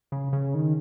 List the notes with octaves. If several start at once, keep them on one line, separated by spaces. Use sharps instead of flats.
C#3
C#3
D#3